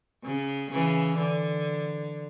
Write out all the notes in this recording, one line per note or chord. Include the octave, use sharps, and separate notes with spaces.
C#3
C#3 E3
D3